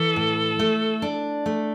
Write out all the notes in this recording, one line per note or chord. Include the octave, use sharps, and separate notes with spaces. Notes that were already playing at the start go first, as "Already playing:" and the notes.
Already playing: E3 A4
A2
A3
D4
A3